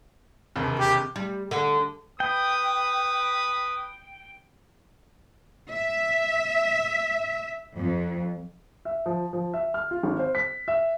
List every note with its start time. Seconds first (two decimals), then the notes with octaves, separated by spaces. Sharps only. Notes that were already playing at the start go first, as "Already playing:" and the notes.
0.56 E1 D#2 C3
0.79 G4
1.16 G3
1.51 D3
2.20 B4 G5 B5 D#6
5.71 E5
7.77 F2
8.85 E5
9.06 F3
9.33 F3
9.54 E5
9.74 F6
9.91 F4
10.03 G#1
10.19 C5
10.35 B6
10.68 E5